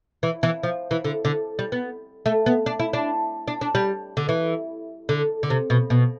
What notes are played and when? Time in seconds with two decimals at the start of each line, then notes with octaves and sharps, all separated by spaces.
0.23 E3
0.43 E3
0.63 F3
0.91 E3
1.04 D3
1.25 D3
1.59 G3
1.72 B3
2.26 A3
2.46 B3
2.66 D4
2.80 E4
2.93 D4
3.47 D4
3.61 D4
3.75 G3
4.17 D3
4.29 E3
5.09 D3
5.43 D3
5.50 C3
5.70 B2
5.90 B2